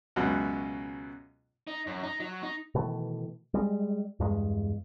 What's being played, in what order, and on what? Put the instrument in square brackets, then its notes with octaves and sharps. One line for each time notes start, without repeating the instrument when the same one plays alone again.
[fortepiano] C#2 F#2 B2
[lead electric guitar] D#4
F#2
D#4
F#3
D#4
[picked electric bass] B2 D#3 E3 A3
G3 G#3
E2 G2 G#3